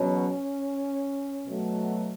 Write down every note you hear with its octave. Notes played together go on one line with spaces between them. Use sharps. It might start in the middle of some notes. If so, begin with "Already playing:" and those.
Already playing: E2 B2 F#3 C#4
B2 F#3 A3